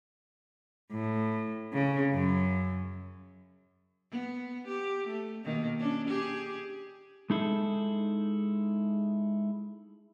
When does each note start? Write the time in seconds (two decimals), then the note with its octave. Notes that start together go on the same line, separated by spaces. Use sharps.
0.92 A2
1.73 C#3
2.14 F#2
4.11 B3
4.67 G4
5.07 A3
5.44 B2 D#3 A#3
5.79 C#4 D4
6.08 G4 G#4
7.30 G#3 D#4 E4 G#4 A4